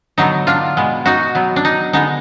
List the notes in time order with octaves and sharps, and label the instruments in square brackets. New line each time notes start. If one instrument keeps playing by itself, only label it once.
[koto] D3 F#3 B3 D#4
D4 F4
B2 G#3 B3
D#4 F#4
B2 F#3 B3
D4
D#4
D3 G#3 B3 D#4